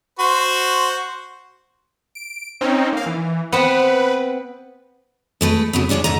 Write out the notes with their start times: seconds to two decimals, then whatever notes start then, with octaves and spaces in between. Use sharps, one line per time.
0.19 F#4 C5
2.15 D7
2.61 C4 C#4 D#4
2.93 A#3 F5
3.06 E3
3.52 B3 C4 B4
5.41 G#3 A3 B4
5.73 C#3 F#3 B3
5.89 D2 G#2 D4 G#4 C#5
6.04 G#2 A3 D#5 A#5